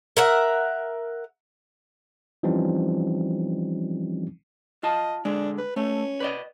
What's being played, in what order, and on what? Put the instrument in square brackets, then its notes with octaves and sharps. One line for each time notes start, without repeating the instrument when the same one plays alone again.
[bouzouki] A#4 E5 F#5
[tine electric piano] E3 F3 G3 C4 C#4 D#4
[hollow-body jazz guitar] F4 A5 [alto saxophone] D#5
[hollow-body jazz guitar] D3 G#3 [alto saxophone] D4
[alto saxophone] B4
[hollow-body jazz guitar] A3 [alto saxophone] C#4
[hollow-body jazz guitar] B4 D5 D#5